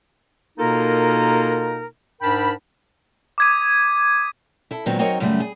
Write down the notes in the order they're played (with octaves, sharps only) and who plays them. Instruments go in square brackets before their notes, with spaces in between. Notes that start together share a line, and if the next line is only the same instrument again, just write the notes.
[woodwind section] B2 A#3 D#4 F4 A4 A#4
G#2 D4 A#4 G5 A5 B5
[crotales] D6 D#6 G#6 B6 D#7
[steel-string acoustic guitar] E4 A4
A#2 D#3 F#3 G#3 B3 C4
F#3 C4 D#4 A#4 C#5 D#5
F#2 C#3 G3 A3
G#4